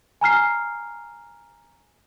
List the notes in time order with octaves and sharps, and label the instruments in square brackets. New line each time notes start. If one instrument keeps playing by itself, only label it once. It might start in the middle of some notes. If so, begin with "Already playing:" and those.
[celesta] G#5 A#5 F6 C7